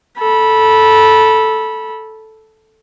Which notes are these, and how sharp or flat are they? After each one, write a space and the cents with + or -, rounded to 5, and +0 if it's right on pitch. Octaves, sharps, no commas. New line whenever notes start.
A4 -5 B5 -20